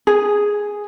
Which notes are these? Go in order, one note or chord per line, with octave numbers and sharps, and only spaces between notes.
G#4